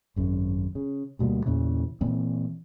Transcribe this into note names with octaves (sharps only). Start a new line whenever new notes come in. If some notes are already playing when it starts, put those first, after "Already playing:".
G#1 F#2 C#3
C#3
D2 B2 G3 A#3
E2 A#2 C#3 E3
A#2 E3 A#3 C4